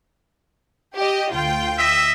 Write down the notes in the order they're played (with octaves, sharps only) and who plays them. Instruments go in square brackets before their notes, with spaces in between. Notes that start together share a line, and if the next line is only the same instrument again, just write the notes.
[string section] G4 D#5
D2 F4 G5
[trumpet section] D#5 E5